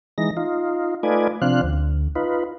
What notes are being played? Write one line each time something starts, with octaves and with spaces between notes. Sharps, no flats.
E3 G#3 D#4 A#6
D#4 F4
A3 D#4 F4 B4 D5 G#5
C3 F3 C4 D4 F5 F#6
D2
D#4 F4 B4